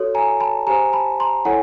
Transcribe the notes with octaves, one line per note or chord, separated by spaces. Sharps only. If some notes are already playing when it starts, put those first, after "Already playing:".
Already playing: F#4 A4 C#5
G#5 A#5
A5 B5
G4 C5 G#5 A#5
A5 B5
A#5 C6
E4 A4 C#5 F#5 G#5